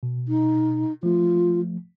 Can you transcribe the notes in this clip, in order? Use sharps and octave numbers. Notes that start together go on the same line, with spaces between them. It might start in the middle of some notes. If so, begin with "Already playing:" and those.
B2
D#4
F3 A3 F4